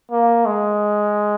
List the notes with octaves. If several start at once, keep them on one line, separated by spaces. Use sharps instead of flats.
A#3
G#3